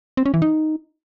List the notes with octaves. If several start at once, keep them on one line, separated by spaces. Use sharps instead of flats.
C4
C#4
E3
D#4